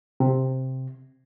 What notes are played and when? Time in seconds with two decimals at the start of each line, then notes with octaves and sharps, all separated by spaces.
0.20 C3